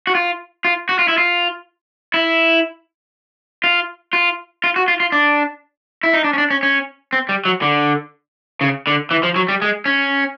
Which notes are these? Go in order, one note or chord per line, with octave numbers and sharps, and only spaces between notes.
F#4
F4
F4
F#4
F4
E4
F4
E4
F4
F4
F4
F#4
F4
F4
D4
E4
D#4
D4
C#4
D4
C#4
C#4
C4
G3
F#3
D3
C#3
D3
E3
F3
F#3
G3
G#3
C#4